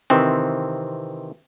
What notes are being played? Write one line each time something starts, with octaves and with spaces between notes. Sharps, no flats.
C3 D#3 E3 C4